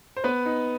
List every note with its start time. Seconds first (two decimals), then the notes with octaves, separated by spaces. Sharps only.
0.17 C5
0.24 B3 B4
0.46 D#4